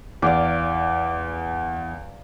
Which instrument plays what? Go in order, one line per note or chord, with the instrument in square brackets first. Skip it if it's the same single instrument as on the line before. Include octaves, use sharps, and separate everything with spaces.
[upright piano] E2 [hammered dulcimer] D5 F5 D6